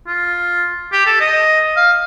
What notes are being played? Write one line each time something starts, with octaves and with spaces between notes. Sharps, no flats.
F4
G4
A4
D#5
F5